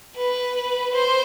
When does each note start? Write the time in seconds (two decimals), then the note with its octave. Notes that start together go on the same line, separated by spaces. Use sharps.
0.16 B4
0.94 C5